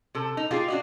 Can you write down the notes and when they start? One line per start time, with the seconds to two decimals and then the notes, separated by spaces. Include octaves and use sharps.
0.15 C3 A4
0.37 D#4
0.51 A#3 F4 G4 G#4
0.68 D4 F#4 D#5